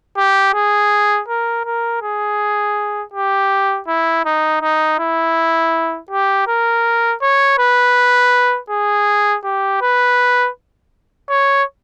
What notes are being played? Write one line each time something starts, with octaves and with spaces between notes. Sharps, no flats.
G4
G#4
A#4
A#4
G#4
G4
E4
D#4
D#4
E4
G4
A#4
C#5
B4
G#4
G4
B4
C#5